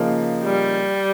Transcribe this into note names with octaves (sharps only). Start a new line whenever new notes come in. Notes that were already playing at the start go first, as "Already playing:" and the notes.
Already playing: C#3 F3 A#3 D#4
G3